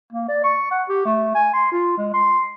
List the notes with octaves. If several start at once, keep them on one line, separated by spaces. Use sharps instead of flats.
A#3
D5
C#6
F#5
G4
A3
G#5
C6
F4
G#3
C6